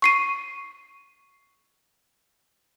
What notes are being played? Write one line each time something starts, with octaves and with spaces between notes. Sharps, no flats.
C#6 C7 D#7